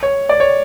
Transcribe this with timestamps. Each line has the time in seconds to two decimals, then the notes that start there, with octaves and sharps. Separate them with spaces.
0.03 C#5
0.29 D5
0.40 C#5